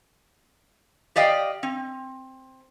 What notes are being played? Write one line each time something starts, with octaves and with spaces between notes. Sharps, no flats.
G4 D5 D#5 F5 G5
C4